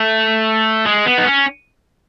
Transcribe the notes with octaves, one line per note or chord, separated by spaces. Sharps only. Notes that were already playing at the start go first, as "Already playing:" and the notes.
Already playing: A3
G#3
B3
D#4
C#4